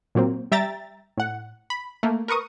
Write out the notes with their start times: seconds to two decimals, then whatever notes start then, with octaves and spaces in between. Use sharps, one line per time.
0.15 A#2 F#3 A#3 C4
0.52 G3 E5 G5 A#5 A6
1.17 A2 F#5
1.70 B5
2.03 A3 A#3
2.28 A#4 B4 C#6 D#6